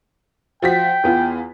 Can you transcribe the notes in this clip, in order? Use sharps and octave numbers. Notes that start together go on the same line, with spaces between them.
F3 F#4 G5 B6
E2 B3 F4